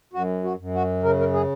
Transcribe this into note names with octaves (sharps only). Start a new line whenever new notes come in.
F#2 F#4
F#4
F#2
F#4
C#3 A#4
A#4
G#4